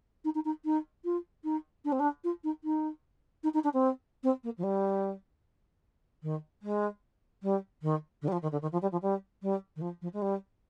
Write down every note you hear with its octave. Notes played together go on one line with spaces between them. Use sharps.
D#4
D#4
D#4
D#4
F4
D#4
D4
C4
D4
F4
D#4
D#4
D#4
D#4
D4
C4
C4
A#3
F3
G3
D#3
G#3
G3
D#3
D3
G3
F3
D#3
D3
D#3
F3
G3
F3
G3
G3
D#3
F3
F3
G#3
G3